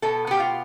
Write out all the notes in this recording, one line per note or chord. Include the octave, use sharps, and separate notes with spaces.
B2 A4
B3 G4
F4